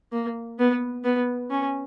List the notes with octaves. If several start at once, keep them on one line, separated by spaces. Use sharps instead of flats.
A#3
B3
B3
C#4